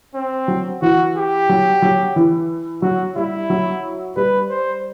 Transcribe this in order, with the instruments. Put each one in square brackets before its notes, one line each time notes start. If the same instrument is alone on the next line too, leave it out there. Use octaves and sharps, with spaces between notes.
[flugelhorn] C4
[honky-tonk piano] F#3
[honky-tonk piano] E3 [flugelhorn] F#4
[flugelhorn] G4
[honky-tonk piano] F#3
F#3
E3
[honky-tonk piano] F#3 [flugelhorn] F#4
[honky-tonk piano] G3 [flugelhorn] E4
[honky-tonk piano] F#3
[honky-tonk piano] G3 [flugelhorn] B4
[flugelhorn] C5